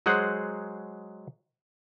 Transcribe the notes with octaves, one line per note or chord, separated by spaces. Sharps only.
F#3 G#3 G#4 C5 F#5